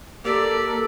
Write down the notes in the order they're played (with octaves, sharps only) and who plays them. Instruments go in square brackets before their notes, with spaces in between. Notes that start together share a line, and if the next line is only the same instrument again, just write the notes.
[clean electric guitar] A#3 [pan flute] G4 [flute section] A4 A#4 E6 [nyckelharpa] D5